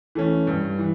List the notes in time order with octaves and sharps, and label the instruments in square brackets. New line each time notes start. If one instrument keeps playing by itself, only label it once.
[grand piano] E3 A3 C#4
G2
E3